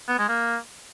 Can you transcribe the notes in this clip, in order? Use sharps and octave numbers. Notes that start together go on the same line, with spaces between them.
B3
G#3
A#3